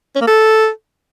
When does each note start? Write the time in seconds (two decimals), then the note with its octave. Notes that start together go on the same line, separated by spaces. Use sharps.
0.15 C#4
0.21 A#3
0.27 A4